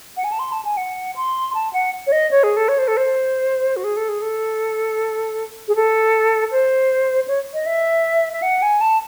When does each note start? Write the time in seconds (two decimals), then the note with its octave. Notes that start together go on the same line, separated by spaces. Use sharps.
0.17 F#5
0.24 G#5
0.32 A5
0.39 C6
0.52 A5
0.65 G#5
0.77 F#5
1.16 C6
1.54 A5
1.73 F#5
2.07 C#5
2.12 D#5
2.31 C#5
2.43 G#4
2.57 A4
2.69 C#5
2.78 C5
2.88 A4
2.97 C5
3.76 F#4
3.84 G#4
3.97 A4
4.09 G#4
4.22 A4
5.68 G#4
5.76 A4
6.52 C5
7.28 C#5
7.54 D#5
7.66 E5
8.33 E5
8.42 F#5
8.62 G#5
8.81 A5